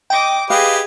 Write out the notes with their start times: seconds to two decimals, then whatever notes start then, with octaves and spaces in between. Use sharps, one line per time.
0.10 D#5 G5 D6
0.50 G4 G#4 B4 D#5 F5